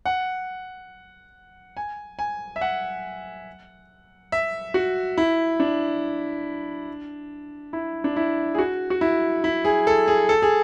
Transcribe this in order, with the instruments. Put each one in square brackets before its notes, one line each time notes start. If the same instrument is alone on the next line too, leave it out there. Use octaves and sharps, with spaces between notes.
[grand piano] F#5
G#5
G#5
E5
F#5
E5
F#4
E4
D4
E4
D4
E4
G#4
F#4
F#4
E4
E4
G#4
A4
G#4
A4
G#4